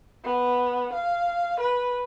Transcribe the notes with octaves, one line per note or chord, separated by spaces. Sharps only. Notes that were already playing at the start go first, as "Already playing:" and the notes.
B3
F5
B4